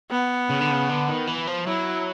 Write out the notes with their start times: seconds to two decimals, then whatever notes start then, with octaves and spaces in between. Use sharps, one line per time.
0.11 B3
0.50 C#3
0.61 D3
0.71 C#3
0.89 D3
1.08 D#3
1.27 E3
1.47 F3
1.66 F#3 E4